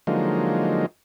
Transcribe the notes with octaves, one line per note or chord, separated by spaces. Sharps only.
D3 F3 F#3 G#3 A#3 D#4